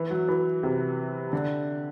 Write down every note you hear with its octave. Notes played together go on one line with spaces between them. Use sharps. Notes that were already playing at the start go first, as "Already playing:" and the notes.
Already playing: E3
F#3
E3
C3
D3